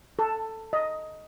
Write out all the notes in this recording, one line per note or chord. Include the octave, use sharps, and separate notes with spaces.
A4
D#5